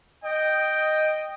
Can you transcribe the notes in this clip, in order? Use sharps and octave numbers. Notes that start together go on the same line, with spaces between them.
D#5 G5